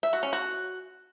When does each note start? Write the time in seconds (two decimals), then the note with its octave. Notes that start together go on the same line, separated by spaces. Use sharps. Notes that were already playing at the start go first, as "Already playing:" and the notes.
0.03 E5
0.13 F#4
0.23 C#4
0.33 F#4